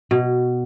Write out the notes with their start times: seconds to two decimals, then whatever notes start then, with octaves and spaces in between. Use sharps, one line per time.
0.11 B2